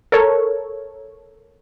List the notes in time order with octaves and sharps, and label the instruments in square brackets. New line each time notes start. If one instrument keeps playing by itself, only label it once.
[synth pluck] A4 A#4 C#5